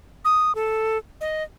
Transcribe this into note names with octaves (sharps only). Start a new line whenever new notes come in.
D#6
A4
D#5